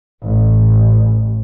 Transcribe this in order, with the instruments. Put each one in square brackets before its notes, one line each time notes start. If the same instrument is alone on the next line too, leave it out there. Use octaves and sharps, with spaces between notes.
[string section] A1